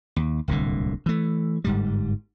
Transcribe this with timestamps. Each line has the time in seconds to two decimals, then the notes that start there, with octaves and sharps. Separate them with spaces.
0.16 D#2
0.48 D1 C2 A#2 D3
1.06 E3 A3
1.64 G1 G#2 G3